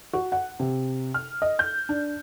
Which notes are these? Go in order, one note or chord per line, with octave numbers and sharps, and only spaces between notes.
F#4
F#5
C3
F6
D#5
G6
D4